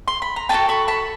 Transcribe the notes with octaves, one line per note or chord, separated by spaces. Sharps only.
C6
B5
A#5
B3 D4 F#4 A4 G5 A5
B5 C#6
A5 B5